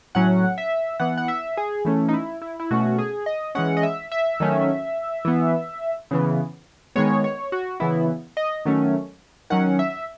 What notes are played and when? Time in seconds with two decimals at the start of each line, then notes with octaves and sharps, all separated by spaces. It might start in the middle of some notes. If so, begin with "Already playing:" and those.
0.15 A2 F#3 C#4 F#5
0.58 E5
1.00 E3 B3 F#5
1.17 F#5
1.28 E5
1.57 G#4
1.85 E3 A3 C#4
2.09 D#4
2.13 E4
2.42 E4
2.60 E4
2.71 B2 A3 C#4 F#4
2.98 G#4
3.26 D#5
3.55 E3 G#3 C#4 F#5
3.77 D#5
3.83 E5
4.12 E5
4.40 D#3 F#3 A3 C#4
5.25 E3 B3
6.11 C#3 E3 B3
6.96 D#3 G#3 B3 C#5
7.24 C#5
7.52 F#4
7.80 C#3 E3 B3 E4
8.37 D#5
8.65 D#3 F#3 A3 C#4
9.50 D#3 F#3 C#4 F#5
9.79 E5